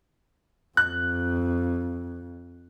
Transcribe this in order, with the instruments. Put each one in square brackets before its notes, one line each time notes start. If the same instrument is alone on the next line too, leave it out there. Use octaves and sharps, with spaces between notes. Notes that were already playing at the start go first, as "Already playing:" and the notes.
[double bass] F2 [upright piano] F#6